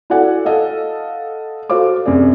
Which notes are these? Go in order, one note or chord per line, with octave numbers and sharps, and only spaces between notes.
E4 F#4 A4 D5 F#5 G#5
A4 D#5 F5 F#5
F#4 A4 C5 F5 D6
F#2 C3 G#4 D5